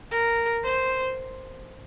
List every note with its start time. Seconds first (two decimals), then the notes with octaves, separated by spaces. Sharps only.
0.12 A#4
0.65 C5